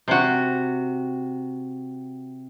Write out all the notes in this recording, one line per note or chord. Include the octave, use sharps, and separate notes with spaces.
C3 F#4